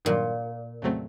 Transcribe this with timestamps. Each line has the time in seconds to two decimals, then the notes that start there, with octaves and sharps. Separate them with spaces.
0.05 G2 A#2 D#3 F#3
0.82 F2 C#3 F#3 A3 C4